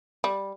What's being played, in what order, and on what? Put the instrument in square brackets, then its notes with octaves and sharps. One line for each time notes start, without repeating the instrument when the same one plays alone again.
[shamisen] G3